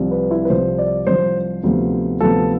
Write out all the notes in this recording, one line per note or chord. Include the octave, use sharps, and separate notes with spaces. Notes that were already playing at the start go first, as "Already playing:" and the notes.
Already playing: C2 C3 F3
B4
E4
B4
C2 C3 F3 C5
D5
C2 C3 F3 C5
D2 C3 F3 B3
D2 C3 F3 B3 A4